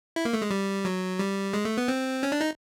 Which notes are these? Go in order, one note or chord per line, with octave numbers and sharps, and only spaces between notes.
E4
A#3
A3
G#3
G3
F#3
G3
G#3
A3
B3
C4
C#4
D4
D#4